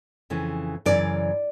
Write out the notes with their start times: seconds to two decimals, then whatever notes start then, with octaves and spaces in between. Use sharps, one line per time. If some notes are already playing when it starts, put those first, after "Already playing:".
0.30 F2 C#3 E3
0.86 F#2 C#3 E3 D5